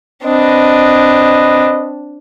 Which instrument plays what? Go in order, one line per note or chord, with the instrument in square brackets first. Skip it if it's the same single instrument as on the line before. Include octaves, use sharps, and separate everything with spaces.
[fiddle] C4 D4 [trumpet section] B4 D#5